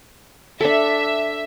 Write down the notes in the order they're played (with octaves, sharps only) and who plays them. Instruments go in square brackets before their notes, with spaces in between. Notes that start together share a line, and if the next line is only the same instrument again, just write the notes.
[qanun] D4 A4 [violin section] E5